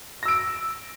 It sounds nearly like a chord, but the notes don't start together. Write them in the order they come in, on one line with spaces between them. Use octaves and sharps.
A#6 E6 D7